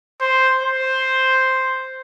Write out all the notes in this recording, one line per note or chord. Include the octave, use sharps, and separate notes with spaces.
C5
C5